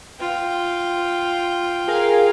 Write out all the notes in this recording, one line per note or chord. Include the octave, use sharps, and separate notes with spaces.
F4 G5
G#4 A#4 F5